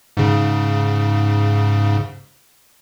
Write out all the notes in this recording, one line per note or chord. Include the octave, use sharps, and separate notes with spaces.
G#2 C#3